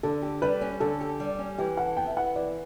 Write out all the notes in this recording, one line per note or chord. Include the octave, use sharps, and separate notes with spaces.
D3 A4
G4
G3 B4
C#4
D3 A4
G4
G3
C#4
E3 G4
A4 F#5
B3 G5
E5
E4 F#5
E3 D5